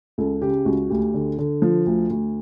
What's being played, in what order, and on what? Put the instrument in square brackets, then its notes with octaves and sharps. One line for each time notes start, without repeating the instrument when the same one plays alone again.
[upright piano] C#2 A4
C#3 G4
C#2 F#4
D2 G4
D3
D3
F3
D2
D2